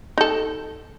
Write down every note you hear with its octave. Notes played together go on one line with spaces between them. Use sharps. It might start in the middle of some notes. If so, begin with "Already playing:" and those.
D#4 A4